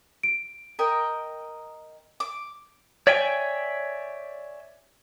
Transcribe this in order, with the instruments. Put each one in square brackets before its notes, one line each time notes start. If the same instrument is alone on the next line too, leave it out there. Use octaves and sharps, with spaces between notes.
[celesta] D7
[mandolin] A#4 D#5 G5
D6
[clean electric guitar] C#5 D5 E5 G5 G#5